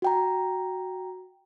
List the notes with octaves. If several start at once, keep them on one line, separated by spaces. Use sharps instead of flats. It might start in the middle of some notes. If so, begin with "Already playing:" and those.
F#4 G5 A#5